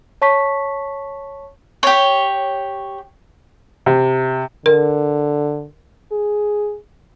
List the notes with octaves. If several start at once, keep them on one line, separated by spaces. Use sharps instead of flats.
C#5 A5 C#6 B6
G4 C#5
C3
D3 A#4
G#4